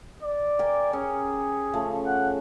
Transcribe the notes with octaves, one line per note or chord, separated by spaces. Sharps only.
D5
G4 A#4 G#5
C#4 G#4
C#3 F3 A3
F#5